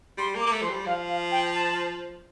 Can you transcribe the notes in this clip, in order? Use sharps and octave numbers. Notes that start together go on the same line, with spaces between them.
G3 C6
A#3
D6
A#3
A3
F3 C6
G3
F3 F5
F5
G5
A5